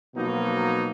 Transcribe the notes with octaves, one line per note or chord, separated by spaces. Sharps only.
B2 F3 F#3 A#3 D#4